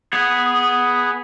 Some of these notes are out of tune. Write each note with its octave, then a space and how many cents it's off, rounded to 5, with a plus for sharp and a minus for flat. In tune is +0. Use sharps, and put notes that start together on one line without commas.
B3 +0 G#4 +0